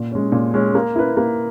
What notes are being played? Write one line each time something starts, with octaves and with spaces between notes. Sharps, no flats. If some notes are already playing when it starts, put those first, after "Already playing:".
Already playing: A#2
G#3 C#4
A#2
G#3 C#4
A#3
E4 B4
A#3